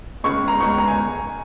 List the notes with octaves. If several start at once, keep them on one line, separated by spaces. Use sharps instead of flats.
C#2 C#3 G#3 C#6
A#5
C#2 C#3 G#3 C#6
A#5
G#5